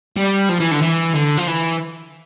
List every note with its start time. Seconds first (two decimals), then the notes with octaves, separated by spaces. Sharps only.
0.16 G3
0.49 F3
0.60 E3
0.71 D3
0.82 E3
1.14 D3
1.37 F3
1.47 E3